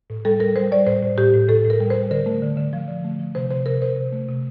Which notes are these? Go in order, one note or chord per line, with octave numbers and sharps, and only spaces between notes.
A2
G3 A4
G3 A#4
G3 C5
G3 D5
A2 C5
A2
A2 G4
A2
A2 A4
A2
A#4
G3
C5
G3
D3 A#4
A3
D3
D3
F3
D3
A3
F3
C3 C5
C3 C5
C3 A#4
C3 C5
C3
A3
C3